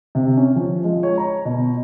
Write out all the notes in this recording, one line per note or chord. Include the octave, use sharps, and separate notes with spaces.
C3
C#4
F3
G#3
C#5
A#5
B2